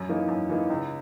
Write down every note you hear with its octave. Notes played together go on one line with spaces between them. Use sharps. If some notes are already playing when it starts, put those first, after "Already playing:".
Already playing: F#2
E3 A#3 D#4
F#2
E3 A#3 D#4
C#2